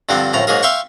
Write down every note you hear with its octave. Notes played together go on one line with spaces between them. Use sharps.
G2 D3 F3 C4 D6
F#2 A2 F3 A#5
G#2 F#3 A#3 G#4 A#4
E5 F5 G5 C6 C#6